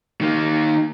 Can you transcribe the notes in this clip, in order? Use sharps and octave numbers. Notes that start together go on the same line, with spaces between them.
D#3 A#3